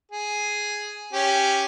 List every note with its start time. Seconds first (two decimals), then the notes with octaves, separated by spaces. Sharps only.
0.11 G#4
1.13 C#4 G4